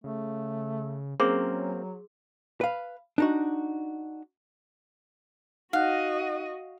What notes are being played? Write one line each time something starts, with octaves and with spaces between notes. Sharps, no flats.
C#3 A3
F#3 A#3 C4 C#4 G#4 C6 E6
B4 F5
D4 D#4 F#4
D#4 F#4 D#5 F5 F#5 F#6